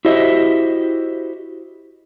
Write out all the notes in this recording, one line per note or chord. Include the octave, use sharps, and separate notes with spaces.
E4 F#4 G4 C5 D#5 E5